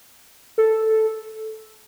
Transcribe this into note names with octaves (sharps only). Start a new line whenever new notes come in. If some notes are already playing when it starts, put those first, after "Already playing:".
A4